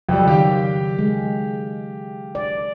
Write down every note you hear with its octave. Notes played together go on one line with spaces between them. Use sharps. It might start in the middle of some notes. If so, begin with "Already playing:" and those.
F2 C#3 F#3 G3
D#3 G4 F5 G5
G#3
D5